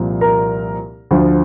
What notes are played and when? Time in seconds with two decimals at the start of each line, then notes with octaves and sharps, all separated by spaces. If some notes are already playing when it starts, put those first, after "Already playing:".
Already playing: C2 A#2 F3
0.21 A#4 A#5
1.11 D2 D3 F3